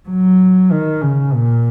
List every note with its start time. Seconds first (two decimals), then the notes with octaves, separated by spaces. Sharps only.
0.09 F#3
0.72 D#3
1.02 C#3
1.34 A#2